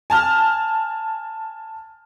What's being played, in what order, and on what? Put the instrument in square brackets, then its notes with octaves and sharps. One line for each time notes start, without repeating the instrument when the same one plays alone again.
[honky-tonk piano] G#5 A5 F6